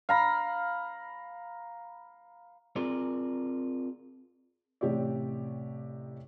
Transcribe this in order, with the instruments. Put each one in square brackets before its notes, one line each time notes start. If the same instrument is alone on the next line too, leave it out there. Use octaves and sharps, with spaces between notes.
[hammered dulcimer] F5 A#5 B5
[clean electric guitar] C4 F4 G#4 A#4 D5
[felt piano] A1 C3 G4 C#5 D5